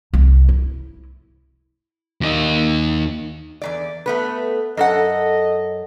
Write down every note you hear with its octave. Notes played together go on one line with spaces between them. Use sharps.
C2
E4
D#2 D#4
E2 G#2 D5
A3 B3 B4
F#2 A4 D#5 F#5